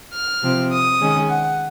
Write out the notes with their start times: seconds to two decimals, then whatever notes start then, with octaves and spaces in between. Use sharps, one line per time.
0.14 F6
0.43 C3 F3 C4
0.72 D#6
1.00 D#3 G#3 C#4
1.29 F#5